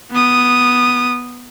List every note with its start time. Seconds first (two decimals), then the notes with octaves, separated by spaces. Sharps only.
0.12 B3 D#6